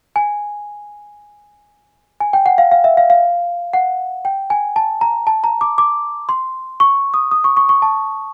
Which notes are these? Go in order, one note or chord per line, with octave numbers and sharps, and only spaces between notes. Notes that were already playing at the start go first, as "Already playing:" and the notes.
G#5
G#5
G5
F#5
F5
F5
E5
F5
F5
F#5
G5
G#5
A5
A#5
A5
A#5
D6
D6
C6
C#6
D#6
D#6
C#6
C#6
C#6
A5